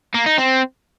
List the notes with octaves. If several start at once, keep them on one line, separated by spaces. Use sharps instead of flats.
A#3
D#4
C4